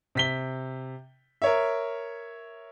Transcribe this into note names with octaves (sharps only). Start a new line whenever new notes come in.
C3 B6 G7
A#4 C#5 E5